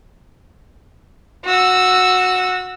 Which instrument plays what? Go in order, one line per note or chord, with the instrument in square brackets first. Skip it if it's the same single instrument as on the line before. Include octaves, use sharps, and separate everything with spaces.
[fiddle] F#4 E6